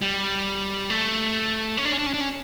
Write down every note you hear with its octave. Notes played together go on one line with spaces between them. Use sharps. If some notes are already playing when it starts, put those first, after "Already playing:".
G3
A3
C#4
D4
C#4
D4
C#4
D4
C#4